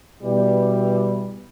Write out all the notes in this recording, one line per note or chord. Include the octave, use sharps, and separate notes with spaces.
B2 E3 G3